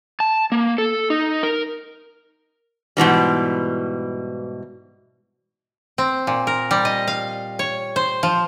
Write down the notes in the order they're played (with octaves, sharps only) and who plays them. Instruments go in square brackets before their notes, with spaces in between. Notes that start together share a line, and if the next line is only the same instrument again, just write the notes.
[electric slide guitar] A5
A#3
A4
D#4
A#4
[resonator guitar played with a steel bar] G#2 B2 E3 G3
[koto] C4
A#2
A#4
G3
D#5
F5
C#5
C5
F3